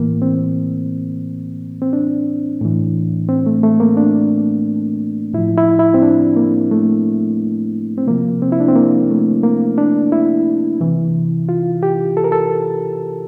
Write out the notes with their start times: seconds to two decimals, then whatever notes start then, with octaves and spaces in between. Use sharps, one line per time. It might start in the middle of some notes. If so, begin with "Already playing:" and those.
Already playing: A2 E3 A#3
0.22 C4
1.82 C4
1.93 D4
2.61 A2 E3
3.29 C4
3.46 A3
3.63 A3
3.80 A#3
3.97 D4
5.34 A2 F3 E4
5.58 E4
5.79 E4
5.94 C4
6.02 D4
6.37 A#3
6.71 A3
7.98 C4
8.07 C3 F3 A#3
8.42 C4
8.52 E4
8.60 D4
8.69 C4
8.75 A#3
9.11 A3
9.43 A#3
9.78 D4
10.12 E4
10.81 C3 E3
11.49 F4
11.83 G4
12.17 A4
12.24 A#4
12.32 A4